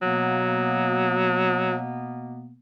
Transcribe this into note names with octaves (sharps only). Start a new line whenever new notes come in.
B2 F#3 A#3 B3